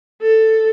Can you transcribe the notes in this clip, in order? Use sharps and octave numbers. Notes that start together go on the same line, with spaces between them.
A4